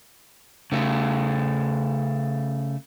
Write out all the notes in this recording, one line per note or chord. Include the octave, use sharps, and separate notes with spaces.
C#3 A3